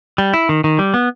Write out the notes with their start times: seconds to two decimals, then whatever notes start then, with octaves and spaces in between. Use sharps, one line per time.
0.18 G3
0.34 E4
0.49 D#3
0.64 D#3
0.79 G3
0.94 B3